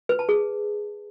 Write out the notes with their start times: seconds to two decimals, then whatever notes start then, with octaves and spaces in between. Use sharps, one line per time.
0.09 B4
0.19 A5
0.29 G#4